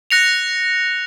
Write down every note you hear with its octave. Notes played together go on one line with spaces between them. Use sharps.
F#6 A#6 C#7 F7